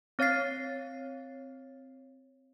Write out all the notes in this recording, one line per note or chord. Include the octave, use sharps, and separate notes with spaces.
C4 C#5 F5 A6 C7